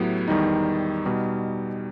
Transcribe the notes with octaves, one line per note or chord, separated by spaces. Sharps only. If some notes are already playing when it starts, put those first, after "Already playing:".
Already playing: A2 F#3 B3 E4 G4
E2 D#3 G3 D#4
B2 G3 D#4